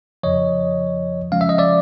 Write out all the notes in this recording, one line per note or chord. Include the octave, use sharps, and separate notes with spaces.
F2 C#3 F3 C#5 D#5
C#3 F3 G#3 C#4 F5
E5
D#5
D5 E5